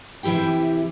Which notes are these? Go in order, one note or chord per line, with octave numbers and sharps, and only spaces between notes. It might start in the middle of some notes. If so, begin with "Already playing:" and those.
C3 E3 E4 G4 G5